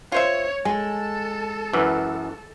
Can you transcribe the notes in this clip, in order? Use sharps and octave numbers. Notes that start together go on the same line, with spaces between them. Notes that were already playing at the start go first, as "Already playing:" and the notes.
F4 C5 C#5 E5
G#3 A4 G#5 A5
F#2 E3 B4